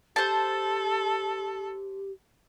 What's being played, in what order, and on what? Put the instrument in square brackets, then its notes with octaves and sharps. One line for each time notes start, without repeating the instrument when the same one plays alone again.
[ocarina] G4 [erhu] A4 [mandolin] C5 A5